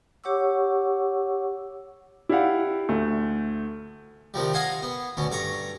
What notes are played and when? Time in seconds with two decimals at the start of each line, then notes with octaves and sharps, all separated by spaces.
0.24 G4 C#5 F#5 C#6 D6 E6
2.29 E4 G4 D5 F5 F#5
2.89 D2 A3
4.34 C3 D#3 F3 G3
4.53 D#5 F5 F#5 G#5 A5 C6
4.83 B3
5.17 D2 B2 C#4
5.31 G2 A4 A#5 C#6